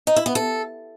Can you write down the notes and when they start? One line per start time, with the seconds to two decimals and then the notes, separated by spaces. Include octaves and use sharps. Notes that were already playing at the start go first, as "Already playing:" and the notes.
0.07 D#4
0.16 E4
0.26 B3
0.35 A4